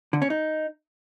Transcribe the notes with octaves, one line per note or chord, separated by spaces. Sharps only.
D3
C#4
D#4